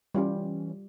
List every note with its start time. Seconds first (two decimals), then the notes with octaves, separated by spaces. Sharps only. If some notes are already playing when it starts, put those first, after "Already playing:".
0.15 E3 G3 C#4 F4 G4